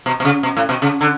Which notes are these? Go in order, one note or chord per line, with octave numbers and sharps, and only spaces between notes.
B2
B2
C#3
B2
A2
B2
C#3
D3